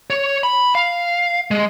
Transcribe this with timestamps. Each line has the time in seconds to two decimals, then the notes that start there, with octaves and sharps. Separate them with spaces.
0.10 C#5
0.43 B5
0.75 F5
1.51 G#3